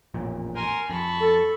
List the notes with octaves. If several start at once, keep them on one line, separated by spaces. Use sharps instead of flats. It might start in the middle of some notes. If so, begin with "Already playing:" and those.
A1 F2 A#2
A#4 G#5 C6
F2 A5 B5 C#6
A4